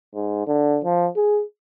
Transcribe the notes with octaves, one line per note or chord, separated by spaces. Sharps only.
G#2
D3
F3
G#4